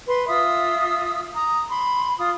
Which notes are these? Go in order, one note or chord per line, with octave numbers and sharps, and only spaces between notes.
B4 C6
F4 E5 D#6 E6
A#5 D#6
B5 C6
F4 D#6